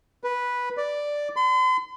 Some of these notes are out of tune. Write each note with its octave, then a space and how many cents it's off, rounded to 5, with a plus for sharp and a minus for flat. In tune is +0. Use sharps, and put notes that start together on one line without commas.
B4 -10
D5 +0
C6 -45